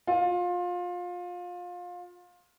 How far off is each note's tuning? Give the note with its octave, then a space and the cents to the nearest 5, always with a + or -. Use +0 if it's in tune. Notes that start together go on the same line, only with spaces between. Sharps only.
F4 +25